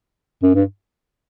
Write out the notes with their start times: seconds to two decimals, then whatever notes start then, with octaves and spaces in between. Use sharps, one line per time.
0.43 F#2
0.55 G2